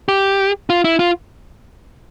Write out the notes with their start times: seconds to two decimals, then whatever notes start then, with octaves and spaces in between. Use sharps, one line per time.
0.08 G4
0.70 F4
0.84 E4
0.99 F4